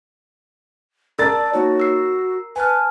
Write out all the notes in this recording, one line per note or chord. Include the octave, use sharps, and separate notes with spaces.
A#4 D5 A5 E6 A6
A#3 D#4 F#4 C#5
E6 C7
B4 G#5 A5 F6